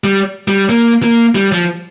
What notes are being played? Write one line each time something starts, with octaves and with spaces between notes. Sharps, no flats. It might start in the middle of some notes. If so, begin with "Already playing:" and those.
G3
G3
A#3
A#3
G3
F3